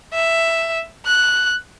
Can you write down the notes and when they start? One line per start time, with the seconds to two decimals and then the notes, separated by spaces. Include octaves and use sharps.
0.14 E5
1.06 F#6